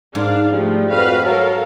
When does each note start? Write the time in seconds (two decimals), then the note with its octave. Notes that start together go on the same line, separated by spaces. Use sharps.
0.15 G#2 D4 F5
0.52 F3 G3 A3
0.91 F2 F#4 B4 F5
1.26 F#3 A4 A#4 F5